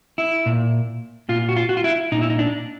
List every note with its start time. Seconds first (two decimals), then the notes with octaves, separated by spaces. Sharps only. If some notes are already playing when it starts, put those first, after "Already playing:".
0.18 E4
0.46 A#2
1.29 A#2 F4
1.49 F#4
1.57 F4
1.69 F#4
1.77 F4
1.84 E4
2.12 A#2 D#4
2.21 E4
2.30 D#4
2.39 D4